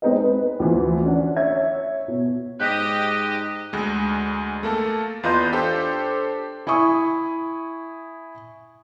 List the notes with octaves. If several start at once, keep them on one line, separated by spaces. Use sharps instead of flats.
G#3 C4 D#4 G#4 B4 D#5
B4
D2 E3 F3
C#4 D4 F#5
C#5 E5 G#6
B2
G#2 G4 D#5 F#6 G6 B6
D2 G#3
A3 A#3 A4 A5
E2 F4 B4 D#5 C6 G6
D4 G4 A4 C5
E4 G#5 C#6 D#6